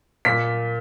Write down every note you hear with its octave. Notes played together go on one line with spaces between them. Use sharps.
A#2 B6